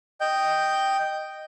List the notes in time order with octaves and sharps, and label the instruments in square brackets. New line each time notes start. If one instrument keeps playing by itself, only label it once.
[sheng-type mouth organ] D#5 G5 G6